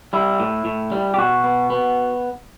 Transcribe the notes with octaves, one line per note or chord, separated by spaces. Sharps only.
G3 E4
A2
A2
G3
G4
B2 F#4
B3
B3